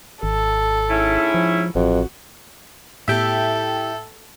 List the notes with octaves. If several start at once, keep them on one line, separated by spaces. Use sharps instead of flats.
G#1 A4
G#2 C#4 E4
F3
A1 F2 F#4
A2 B3 E4 G4 A4 E5 G5